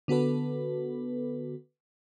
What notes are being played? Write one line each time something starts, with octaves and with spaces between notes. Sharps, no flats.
D3 B3 F#4 A4 B4